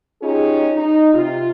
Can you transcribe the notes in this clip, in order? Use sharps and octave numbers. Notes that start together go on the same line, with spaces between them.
C#4 D#4 F4 G4 G#4
D#4
C3 F4